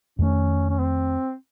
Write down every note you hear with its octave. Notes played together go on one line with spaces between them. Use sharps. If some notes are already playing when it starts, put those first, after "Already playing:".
F2 D#3 A3 C#4
C#4
C4